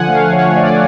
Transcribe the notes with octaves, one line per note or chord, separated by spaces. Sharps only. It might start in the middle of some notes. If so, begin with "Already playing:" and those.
Already playing: D3 F3 F#5 G#5
A3 F5
A3 C#5
A3 D5